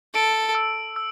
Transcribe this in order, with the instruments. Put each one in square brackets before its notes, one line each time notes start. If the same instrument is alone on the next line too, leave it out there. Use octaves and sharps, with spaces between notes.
[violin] A4 [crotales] D7
[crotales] E6
E6